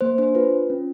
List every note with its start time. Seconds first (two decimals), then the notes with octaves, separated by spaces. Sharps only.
0.01 A#3 C5
0.18 D4 C5
0.35 F4 B4
0.53 F4
0.70 C#4